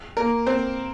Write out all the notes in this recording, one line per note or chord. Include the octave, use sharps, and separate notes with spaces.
A#3 A#4
C4 C5